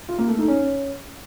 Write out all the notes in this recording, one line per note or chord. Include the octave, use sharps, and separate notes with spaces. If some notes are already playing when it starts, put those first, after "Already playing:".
F4
A#3
A3
D#4
C#4